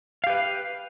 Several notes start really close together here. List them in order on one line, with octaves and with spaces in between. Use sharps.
F5 G4 B4